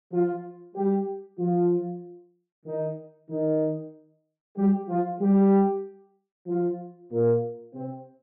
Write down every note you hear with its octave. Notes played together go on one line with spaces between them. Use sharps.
F3 F4
G3 G4
F3 F4
D#3 D#4
D#3 D#4
G3 G4
F3 F4
G3 G4
F3 F4
A#2 A#3
C3 C4